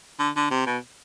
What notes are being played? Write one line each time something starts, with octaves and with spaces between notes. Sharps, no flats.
D3
D3
C3
B2